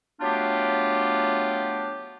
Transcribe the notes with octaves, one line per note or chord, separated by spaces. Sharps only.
F#3 A3 B3 D4 F4 G4